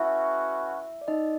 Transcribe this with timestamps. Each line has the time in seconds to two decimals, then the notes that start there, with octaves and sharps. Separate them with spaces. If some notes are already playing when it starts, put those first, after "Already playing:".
Already playing: A3 C#4 E4 F#4 B4 E5
1.01 D5
1.08 D#4 D#5